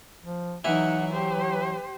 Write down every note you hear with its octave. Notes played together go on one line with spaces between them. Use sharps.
F3
E3 F#3 D#4 E4 F#5
G4 C5